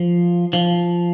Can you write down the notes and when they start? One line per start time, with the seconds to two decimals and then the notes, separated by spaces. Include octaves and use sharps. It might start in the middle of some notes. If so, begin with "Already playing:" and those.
Already playing: F3
0.53 F3